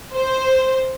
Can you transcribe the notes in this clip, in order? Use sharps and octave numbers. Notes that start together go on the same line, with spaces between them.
C5